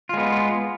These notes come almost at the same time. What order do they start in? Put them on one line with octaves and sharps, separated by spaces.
F4 G#3 B3